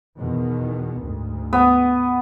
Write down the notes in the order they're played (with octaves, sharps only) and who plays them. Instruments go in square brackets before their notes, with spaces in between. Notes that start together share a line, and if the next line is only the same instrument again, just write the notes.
[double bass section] E2 B2 D#3
D2 G#2
[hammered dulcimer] B3